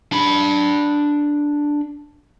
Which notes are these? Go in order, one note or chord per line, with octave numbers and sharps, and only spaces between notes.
D4 B5